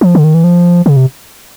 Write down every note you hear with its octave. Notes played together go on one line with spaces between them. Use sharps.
F3
D3
D#3
E3
F3
C#3
C3